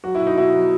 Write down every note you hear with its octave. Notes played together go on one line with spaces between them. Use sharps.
F#3 F#4
E4
B2
D#4
B2 E4
F#3